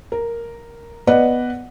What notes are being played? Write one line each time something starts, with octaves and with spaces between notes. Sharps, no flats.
A#4
B3 B4 D5 D#5 F#5